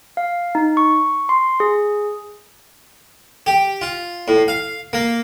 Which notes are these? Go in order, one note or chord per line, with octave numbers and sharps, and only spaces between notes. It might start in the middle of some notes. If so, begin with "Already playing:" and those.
F5
D#4
C#6
C6
G#4
G4
F4
A2
F5
A#3